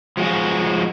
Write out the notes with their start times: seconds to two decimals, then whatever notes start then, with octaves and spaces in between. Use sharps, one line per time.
0.17 F3 G#3 F#4